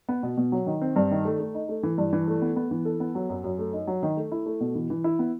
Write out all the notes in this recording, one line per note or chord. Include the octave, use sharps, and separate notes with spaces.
B3
B2
B2
F#3
D#3
C4
G2
D#3
A3
A3
D#4
A3
E3
G2
E3
A3
B3
B3
E3
A4
B3
F#3
F#2
F#2
A3
D#4
F#3
D#3
A3
E4
A3
B2
E3
E3
E4
B3